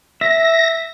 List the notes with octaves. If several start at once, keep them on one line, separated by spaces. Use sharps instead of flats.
E5 A#6